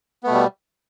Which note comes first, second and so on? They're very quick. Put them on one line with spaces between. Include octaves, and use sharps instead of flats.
B3 A3 B2 G3